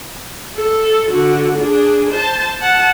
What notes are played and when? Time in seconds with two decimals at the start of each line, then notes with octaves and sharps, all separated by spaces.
0.56 A4
1.09 D3 F#4
1.58 D4 G#4
2.10 C5 A5
2.60 F#5 A5